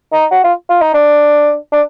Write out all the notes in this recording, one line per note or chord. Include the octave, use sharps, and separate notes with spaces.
D#4
F#4
F4
F4
D#4
D4
D4